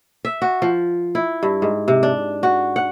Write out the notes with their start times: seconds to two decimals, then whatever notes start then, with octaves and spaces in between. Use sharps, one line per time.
0.25 E5
0.42 F#4
0.62 F3
1.15 E4
1.43 G2
1.62 G#2
1.88 C3
2.03 D4
2.43 F#4
2.76 F#5